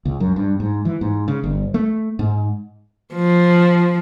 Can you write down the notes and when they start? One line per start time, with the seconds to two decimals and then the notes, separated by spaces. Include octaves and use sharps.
0.05 C#2
0.20 F#2
0.36 G2
0.60 G#2
0.85 E3
1.01 G#2
1.28 C#3
1.44 G1
1.74 A3
2.19 G#2
3.14 F3